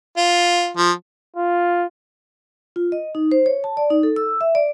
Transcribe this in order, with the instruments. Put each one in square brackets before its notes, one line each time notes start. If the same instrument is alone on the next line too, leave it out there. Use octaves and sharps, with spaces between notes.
[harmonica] F4
F3
[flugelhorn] F4
[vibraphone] F4
D#5
D#4
C5
C#5
A5
D5
D#4
A4
E6
E5
D5